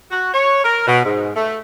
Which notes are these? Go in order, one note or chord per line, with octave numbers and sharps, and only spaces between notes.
F#4
C#5
A#4
B2
G#2
A3